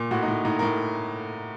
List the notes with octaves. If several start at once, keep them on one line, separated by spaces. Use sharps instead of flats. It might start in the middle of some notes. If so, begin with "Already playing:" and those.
Already playing: A#2
A2 F#4
D#4
A2
A2 D#4
A2 A#4